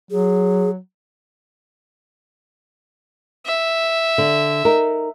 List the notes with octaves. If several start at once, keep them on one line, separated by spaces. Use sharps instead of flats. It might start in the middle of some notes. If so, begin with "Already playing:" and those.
F#3 G#4
E5
D3
D#4 A#4